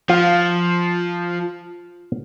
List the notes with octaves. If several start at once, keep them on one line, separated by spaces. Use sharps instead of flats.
F3 F4